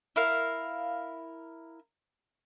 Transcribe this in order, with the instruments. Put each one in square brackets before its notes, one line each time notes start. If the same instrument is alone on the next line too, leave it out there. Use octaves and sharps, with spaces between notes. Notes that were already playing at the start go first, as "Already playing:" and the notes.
[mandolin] E4 A#4 F5